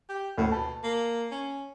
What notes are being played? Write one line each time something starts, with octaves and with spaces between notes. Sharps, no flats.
G4
D2 A2
B2 A5
A#3
C#4